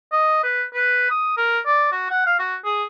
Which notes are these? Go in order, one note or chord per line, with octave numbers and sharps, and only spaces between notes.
D#5
B4
B4
D#6
A#4
D5
F#4
F#5
F5
F#4
G#4